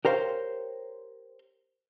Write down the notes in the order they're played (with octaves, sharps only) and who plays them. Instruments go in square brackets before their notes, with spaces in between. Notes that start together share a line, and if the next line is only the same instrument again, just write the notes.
[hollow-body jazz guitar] G4 A#4 C5 C#5 F5